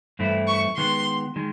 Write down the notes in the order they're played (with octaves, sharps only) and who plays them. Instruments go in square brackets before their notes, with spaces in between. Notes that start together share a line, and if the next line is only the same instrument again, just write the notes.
[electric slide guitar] G2 E3 A3 C4 E4
[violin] C#6
[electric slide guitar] D#3 G#3 B3 [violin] C6
[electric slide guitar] D#3 G#3